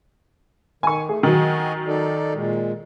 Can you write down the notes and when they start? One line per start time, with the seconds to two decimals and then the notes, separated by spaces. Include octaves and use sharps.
0.83 D#3 G#5 C#6
1.09 A3 G#4
1.23 D#3 F#3 F#4 D#5 G#5
1.87 D#4 A4 D5
2.34 A#2 G#3